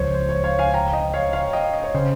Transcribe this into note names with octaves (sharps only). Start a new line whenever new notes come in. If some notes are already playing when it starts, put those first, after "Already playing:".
Already playing: C#2 C#3 F3 C5 C#5
C5
C#5
C#5 F5
F5 G#5
G5 A#5
D#5 G5
C#5 F5
C#5 F5
D#5 G5
D#5
C#5
C#3 C5